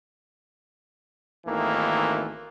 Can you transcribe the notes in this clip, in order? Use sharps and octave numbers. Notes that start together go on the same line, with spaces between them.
G#1 D#3 E3 A3 A#3